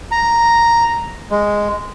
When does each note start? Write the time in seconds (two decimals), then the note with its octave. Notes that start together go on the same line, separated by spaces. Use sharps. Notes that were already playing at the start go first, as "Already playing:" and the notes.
0.12 A#5
1.30 G#3